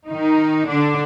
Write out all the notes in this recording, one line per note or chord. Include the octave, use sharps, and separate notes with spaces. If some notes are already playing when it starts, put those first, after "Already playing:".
D#3 D#4
D3 D4